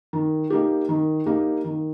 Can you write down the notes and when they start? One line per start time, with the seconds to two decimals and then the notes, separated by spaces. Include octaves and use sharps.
0.13 D#3
0.50 A#3 D#4 G4
0.89 D#3
1.26 A#3 D#4 G4
1.64 D#3